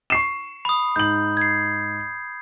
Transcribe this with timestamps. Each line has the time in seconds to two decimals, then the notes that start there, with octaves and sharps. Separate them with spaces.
0.10 C#6 C7 E7
0.65 B5 D#6
0.96 G#2 G6 F#7
1.37 G#6 C7